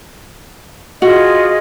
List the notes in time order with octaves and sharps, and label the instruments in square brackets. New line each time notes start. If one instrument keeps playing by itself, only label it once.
[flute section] F4 G#4 D#5 [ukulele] F#4